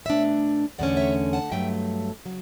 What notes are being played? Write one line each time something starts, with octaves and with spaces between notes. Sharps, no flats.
B2 A3 D4 C#5 E5
E2 D3 A3 C#4 D5 F#5
C#5 E5
F#5 A5
G2 F#3 A3 E5 G5
C#3 F#3